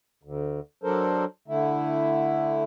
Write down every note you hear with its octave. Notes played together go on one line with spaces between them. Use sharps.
D2
F#3 D4 A4 A#4 C5
D3 A3 E4